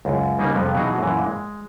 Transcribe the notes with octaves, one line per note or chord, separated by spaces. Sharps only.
C#2 F#2
C#3 G3 A#3 D#4 G#4 A#4
F2 C3 G3 B3
B2 E3 F#3 D#4 F#4 G#4
F#2 A#2 E3
G#3